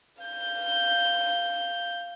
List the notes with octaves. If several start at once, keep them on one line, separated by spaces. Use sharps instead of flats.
F5 G6